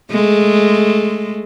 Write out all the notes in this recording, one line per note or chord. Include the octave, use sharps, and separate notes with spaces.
G#3 A3